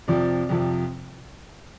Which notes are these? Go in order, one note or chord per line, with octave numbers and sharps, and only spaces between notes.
F2 C3 F3 D5
F2 C3 F3